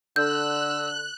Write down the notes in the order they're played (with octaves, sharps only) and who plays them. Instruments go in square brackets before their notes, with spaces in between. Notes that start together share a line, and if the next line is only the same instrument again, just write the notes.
[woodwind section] D3 [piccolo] E6 [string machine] F#6 [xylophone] G6